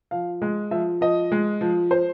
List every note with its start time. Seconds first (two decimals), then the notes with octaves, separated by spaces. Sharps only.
0.11 F3 F5
0.42 G#3
0.71 F3 E5
1.01 F3 D#5
1.32 G#3
1.61 F3
1.91 C5